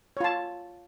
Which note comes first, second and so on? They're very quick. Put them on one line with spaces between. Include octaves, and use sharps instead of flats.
C#5 F4 A5